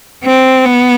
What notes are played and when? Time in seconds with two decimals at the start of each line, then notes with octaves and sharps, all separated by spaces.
0.24 C4
0.65 B3